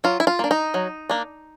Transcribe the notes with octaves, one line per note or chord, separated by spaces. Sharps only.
F#3 F4
E4
F4
A#3 D4
D#4
F#3
A#3 D4